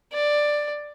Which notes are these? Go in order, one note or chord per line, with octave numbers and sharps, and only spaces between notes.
D5